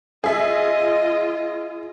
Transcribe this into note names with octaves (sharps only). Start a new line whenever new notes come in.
F4 G#4 D#5 E5